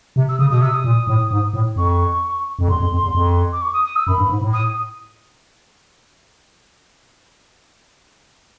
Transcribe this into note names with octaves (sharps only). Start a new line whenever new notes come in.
C3
E6
C#3 D#6
B2 D#6
C3 E6
D#6
A#2
A2
G#2
A2
F2 C#6
F2
E2 C6
F2
F2
E2
F2
D6
C#6
D#6
D#6
E6
F#2 B5
G2
G#2
A2
D#6